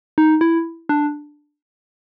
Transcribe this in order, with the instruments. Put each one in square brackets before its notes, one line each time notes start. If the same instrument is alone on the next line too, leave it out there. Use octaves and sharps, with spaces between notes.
[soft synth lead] D#4
E4
D4